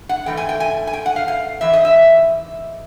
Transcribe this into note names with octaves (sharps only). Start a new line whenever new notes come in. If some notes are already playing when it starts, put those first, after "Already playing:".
Already playing: A2
F#5
G#2 E3 A3 G5
G#5
G5
G#5
G#5
G5
F#5
F5
F5
G#2 E3 E5
D#5
E5